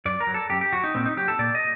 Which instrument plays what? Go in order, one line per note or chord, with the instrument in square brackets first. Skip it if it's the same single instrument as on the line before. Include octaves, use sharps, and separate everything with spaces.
[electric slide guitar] F#2 D5
A#4
F#3
A4
F#2 G4
G4
F#3 F#4
D#4
A#2 C4
D#4
F#3 G4
A4
A#2 D5
D#5